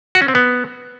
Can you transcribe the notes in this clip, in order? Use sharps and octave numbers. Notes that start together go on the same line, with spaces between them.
F#4
C#4
C4
B3